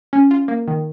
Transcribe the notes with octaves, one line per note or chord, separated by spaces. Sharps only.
C#4
F4
A#3
D#3